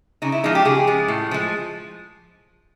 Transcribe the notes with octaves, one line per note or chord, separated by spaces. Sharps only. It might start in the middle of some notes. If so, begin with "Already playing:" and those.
C#3 D#4
E4
F3 G#3 D#4
G4
C#3 G#4
F3 G#3
A2
F3 G#3